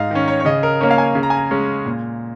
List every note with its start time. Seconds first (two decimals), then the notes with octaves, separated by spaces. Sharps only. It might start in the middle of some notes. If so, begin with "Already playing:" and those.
Already playing: G#2 D#5 F5
0.11 D#3 C#4
0.28 C#5
0.40 C#5
0.45 C#3 D#5
0.63 A#4
0.81 A#3 C#4 C#5
0.91 F5
0.98 G#5
1.15 C#3
1.23 A#5
1.30 G#5
1.37 A#5
1.51 G#3 C#4
1.86 A#2